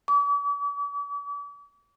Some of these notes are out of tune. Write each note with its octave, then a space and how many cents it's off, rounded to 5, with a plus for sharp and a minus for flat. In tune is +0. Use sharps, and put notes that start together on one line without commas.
D6 -45